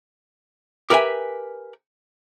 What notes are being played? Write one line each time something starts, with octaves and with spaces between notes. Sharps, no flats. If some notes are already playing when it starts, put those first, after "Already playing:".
G4 A#4 B4 E5 G#5